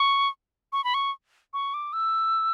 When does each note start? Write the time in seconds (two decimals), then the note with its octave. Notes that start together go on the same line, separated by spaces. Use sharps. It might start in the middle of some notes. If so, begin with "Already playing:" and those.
Already playing: C#6
0.73 C#6
0.84 B5
0.94 C#6
1.54 C#6
1.74 D6
1.93 E6